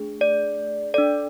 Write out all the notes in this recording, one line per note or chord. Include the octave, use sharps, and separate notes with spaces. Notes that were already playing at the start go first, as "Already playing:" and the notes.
Already playing: A3 D4 G#4
D5
D4 A4 D5